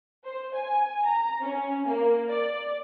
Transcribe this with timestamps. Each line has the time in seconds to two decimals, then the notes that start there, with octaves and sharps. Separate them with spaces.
0.25 C5
0.54 G#5
1.05 A#5
1.41 C#4
1.87 A#3
2.29 D5